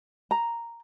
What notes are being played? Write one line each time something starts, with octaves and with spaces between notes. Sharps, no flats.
A#5